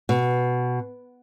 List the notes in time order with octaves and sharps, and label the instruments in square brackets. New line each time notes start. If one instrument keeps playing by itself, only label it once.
[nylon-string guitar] B2